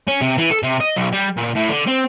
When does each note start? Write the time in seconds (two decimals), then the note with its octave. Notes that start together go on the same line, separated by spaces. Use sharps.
0.08 C#4
0.21 C3
0.38 E3
0.50 A4
0.63 C3
0.80 D#5
0.96 B1
1.12 G3
1.37 A#2
1.55 A2
1.69 D3
1.87 C4